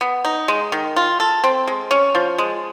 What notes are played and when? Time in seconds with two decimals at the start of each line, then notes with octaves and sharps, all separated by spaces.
0.01 B3
0.25 D#4
0.48 G#3
0.72 D#3
0.96 F4
1.20 A4
1.44 C4
1.67 G#3
1.91 C#4
2.15 F3
2.38 G#3